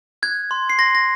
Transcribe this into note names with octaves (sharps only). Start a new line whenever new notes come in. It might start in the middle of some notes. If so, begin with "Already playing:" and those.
F#6 G#6
C6
C7
C6 A#6
A#6